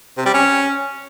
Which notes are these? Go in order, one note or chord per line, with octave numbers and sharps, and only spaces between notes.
C3
G3
C#4